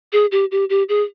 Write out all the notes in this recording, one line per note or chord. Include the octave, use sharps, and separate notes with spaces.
G#4
G4
G4
G4
G#4